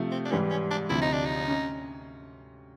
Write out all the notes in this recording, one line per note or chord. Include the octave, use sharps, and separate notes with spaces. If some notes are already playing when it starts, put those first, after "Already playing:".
Already playing: C3 F3 A3
C4
D4
G#2 E3 G3 C#4
C#4
D4
D2 C3 F3 E4
D#4
D4
D#4
C#4